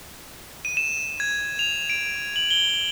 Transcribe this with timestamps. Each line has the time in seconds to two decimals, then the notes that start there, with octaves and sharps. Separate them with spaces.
0.65 D#7
0.77 E7
1.20 G#6
1.59 F7
1.90 D7
2.36 F#7
2.51 G7